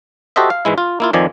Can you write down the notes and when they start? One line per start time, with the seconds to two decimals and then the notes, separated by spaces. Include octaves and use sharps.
0.36 F#4 G4 A4 C5 D#5 E5
0.50 F5
0.65 G#2 E3 G#3 E4
0.78 F4
1.00 A#3 E4 F4
1.13 F2 D#3 F3 D5 G#5